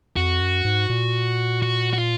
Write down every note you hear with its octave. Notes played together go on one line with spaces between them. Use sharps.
F2 F#4
F#2
G#2
A#2
F#4
F#4
F4